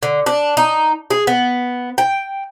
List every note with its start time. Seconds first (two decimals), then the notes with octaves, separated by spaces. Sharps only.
0.03 D3
0.26 D4
0.57 D#4
1.10 G#4
1.27 B3
1.98 G5